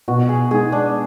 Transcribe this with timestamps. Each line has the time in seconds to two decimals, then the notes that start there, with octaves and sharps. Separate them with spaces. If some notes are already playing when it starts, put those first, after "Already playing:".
0.08 B2 F#4
0.29 G#4
0.51 G#3 D#4 G#4
0.72 D4